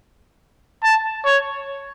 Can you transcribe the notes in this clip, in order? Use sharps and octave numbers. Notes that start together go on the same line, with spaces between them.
A5
C#5